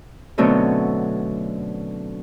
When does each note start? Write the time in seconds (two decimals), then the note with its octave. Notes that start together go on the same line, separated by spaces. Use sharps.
0.38 B2 D3 F#3 A3 C4 C#4